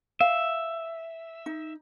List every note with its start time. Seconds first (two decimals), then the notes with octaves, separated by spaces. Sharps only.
0.21 E5 F5
1.46 D#4